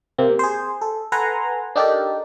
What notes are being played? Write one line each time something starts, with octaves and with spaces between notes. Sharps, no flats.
C3 A#3 C4
G#4 C5
A4
A4 B4 F#5 G#5 A#5 C6
D4 D#4 G4 A4 A#4 D5